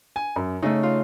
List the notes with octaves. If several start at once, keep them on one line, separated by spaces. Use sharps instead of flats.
G#5
F#2
C#3 A3 D#4
F4